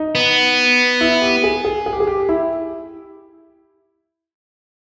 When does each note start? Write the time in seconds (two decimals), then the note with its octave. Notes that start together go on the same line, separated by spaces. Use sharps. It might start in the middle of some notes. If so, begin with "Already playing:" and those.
Already playing: D#4
0.15 B3
1.01 E4
1.22 G4
1.44 G#4
1.65 G#4
1.86 G#4
1.93 G4
2.00 G#4
2.07 G4
2.29 E4